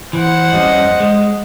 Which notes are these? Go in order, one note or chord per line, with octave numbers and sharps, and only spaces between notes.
E3 C5 F#5
F2 G3 C#4 D#5
G#3